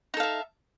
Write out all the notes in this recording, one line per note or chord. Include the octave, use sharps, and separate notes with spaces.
D#4 A4 E5 F5